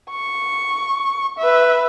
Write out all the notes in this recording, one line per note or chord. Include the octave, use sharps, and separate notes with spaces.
C#6
B4 E5